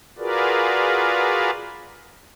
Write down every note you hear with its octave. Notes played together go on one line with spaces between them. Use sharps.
F4 F#4 G#4 A#4 B4 D5